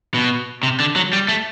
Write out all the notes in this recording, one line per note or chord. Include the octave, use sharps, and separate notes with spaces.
B2
C3
D3
F#3
G3
A3